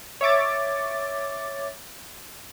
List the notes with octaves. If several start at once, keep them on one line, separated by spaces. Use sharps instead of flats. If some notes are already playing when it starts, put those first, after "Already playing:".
C#5 E5 D6 A6